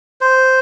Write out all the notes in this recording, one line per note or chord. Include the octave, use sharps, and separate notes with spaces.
C5